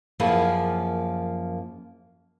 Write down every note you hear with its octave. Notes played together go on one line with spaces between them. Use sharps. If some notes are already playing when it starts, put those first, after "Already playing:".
F#2 F3 A#3 G#4 B4